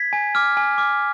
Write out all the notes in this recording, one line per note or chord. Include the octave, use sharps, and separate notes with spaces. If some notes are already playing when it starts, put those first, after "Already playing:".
Already playing: G#6 B6
G#5
D6 F6
G#5
D6 F6